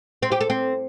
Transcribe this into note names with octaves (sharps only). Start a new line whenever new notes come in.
C4
G4
A4
C4